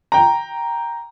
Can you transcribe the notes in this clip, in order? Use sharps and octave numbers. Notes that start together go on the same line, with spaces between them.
G5 A#5